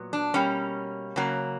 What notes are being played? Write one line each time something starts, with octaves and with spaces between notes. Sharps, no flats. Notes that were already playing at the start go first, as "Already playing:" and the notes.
Already playing: A#2 F#3 B3
D4
B2 G3 A#3 C#4
C#3 F#3 A#3